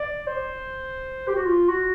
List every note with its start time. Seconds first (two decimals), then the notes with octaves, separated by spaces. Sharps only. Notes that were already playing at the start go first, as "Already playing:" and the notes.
Already playing: D5
0.27 C5
1.27 G4
1.36 F#4
1.46 F4
1.69 F#4